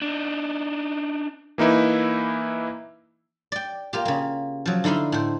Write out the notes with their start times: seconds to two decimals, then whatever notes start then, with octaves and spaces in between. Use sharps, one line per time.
0.02 D4 D#4
1.58 E3 A#3 D#4 E4 B4
3.52 D5 G5
3.93 A#3 F4 G4
4.05 C#3 A#3
4.66 F3 F#3
4.84 D3 D#4 E4 F5 C6
5.12 A2 C5